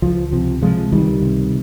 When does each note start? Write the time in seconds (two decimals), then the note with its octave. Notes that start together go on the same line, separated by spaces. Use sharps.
0.02 C#2 F3
0.32 C3 F3
0.62 C3 F3 G#3
0.92 C#2 D#3 G3
1.22 C3